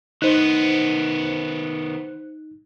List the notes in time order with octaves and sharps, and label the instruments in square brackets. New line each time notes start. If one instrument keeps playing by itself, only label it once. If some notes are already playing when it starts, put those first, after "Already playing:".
[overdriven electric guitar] D#3 B3 [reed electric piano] D#4 [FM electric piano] C5 F#6